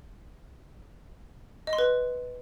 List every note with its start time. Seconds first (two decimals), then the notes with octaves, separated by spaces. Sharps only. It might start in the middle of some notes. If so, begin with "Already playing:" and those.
1.67 D#5
1.73 C6
1.78 B4